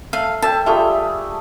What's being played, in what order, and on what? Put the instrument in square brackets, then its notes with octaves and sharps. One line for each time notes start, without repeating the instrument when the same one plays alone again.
[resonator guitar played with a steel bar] A3 [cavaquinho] F5
[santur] A4 E5 G5 [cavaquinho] A5
[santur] G3 A3 G#4 [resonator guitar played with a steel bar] F4 E5